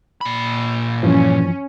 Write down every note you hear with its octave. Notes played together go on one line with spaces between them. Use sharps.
A#2 B5
G2 E3 F3 C#4